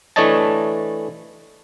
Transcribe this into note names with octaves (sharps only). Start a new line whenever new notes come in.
E3 A3 D4 C#5 D#5 A5